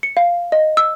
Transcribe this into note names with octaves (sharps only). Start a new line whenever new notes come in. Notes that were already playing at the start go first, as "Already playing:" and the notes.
C#7
F5
D#5
E6